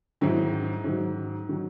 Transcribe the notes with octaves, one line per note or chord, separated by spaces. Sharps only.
G#2 D#3 F#3 E4
G#2 D#3 F#3
D#3 F#3